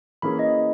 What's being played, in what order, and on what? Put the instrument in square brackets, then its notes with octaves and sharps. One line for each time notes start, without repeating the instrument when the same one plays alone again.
[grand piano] E3 A#3 C#4 E4 G#4 [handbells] B5
[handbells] D#5